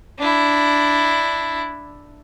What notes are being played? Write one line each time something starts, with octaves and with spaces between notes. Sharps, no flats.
D4 E4